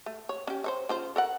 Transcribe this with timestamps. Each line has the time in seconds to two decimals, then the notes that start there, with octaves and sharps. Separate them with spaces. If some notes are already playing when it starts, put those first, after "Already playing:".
0.06 A3
0.29 C#5
0.47 C#4 G4
0.64 C5 C#5 E5
0.89 C#3 F4 C5
1.16 A4 A#4 F#5